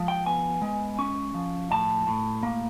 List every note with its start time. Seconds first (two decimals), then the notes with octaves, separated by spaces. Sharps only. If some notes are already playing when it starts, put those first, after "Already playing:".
Already playing: F3 G#3
0.08 G5
0.26 B3 G#5
0.62 G#3
0.99 C#4
1.34 F3
1.71 A2 A5
2.07 A2
2.43 A#3